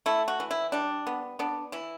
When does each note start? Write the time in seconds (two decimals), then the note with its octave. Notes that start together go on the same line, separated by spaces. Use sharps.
0.06 A3 E4
0.28 F#4
0.40 E3
0.51 E4
0.72 G3 D4
1.07 B3
1.39 B3 D4
1.72 E3 E4